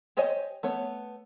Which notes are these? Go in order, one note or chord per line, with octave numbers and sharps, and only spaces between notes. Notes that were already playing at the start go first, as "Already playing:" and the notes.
G4 C5 C#5 D#5 G#5
A3 B3 C#5